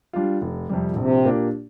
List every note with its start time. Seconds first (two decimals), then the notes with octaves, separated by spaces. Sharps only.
0.13 G3 D4 F4
0.42 F1
0.69 F2 C3 G3
0.92 A#2
0.96 A#1 C3
1.24 A#2 A#3 D4 G4